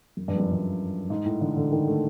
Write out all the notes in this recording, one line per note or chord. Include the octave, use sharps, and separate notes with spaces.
F#2
G2
F2
F#2
G2
G#2
A2
D3
D3
D#3
A3